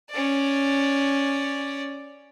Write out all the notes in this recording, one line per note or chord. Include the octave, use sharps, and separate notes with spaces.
C#4 D5